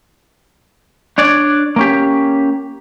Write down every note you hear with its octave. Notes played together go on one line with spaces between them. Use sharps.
D4 C#5 D5
A#3 C#4 G4